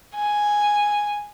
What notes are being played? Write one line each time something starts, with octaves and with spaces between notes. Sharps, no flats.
G#5